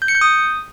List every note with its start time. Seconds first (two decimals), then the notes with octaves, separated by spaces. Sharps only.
0.02 G6
0.08 C#7
0.15 G6
0.21 D#6